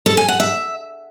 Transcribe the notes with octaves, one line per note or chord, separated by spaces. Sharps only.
A4
G#5
F#5
E5